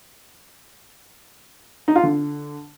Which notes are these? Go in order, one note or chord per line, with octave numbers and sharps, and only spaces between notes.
D#4
F4
D3